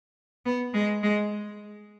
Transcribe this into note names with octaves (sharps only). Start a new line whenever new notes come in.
B3
G#3
G#3